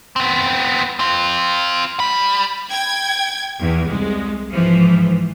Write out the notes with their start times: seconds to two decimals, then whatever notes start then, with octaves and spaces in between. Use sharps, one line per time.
0.16 B3 C4
0.99 C4 F4
2.00 G3 B5
2.71 G5 G#6
3.58 E2
3.87 C2 G#3
4.49 G#2 E3 F3